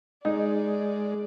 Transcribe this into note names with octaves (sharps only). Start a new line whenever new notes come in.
G#3 D#4 G#4 D5